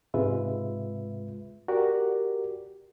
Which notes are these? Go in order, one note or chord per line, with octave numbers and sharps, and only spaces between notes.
G#2 C3 G#3 F4 B4 E5
F#4 G4 A#4 D5